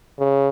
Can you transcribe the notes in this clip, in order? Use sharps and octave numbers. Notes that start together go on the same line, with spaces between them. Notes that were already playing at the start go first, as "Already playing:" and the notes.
C#3